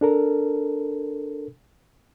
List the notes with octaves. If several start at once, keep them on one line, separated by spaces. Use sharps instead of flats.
D4 A4 A#4